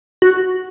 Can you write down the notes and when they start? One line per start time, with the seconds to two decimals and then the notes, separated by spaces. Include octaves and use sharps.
0.22 F#4